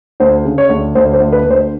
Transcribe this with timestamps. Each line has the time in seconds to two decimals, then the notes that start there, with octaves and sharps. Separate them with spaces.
0.20 D2 C5
0.45 C#3
0.58 C#5
0.69 D2
0.95 D2 C5
1.13 C5
1.20 D2
1.32 B4
1.44 D2
1.50 C5